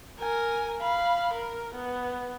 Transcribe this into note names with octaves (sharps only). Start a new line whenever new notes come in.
A#4 G#5
F5 B5
A#4
B3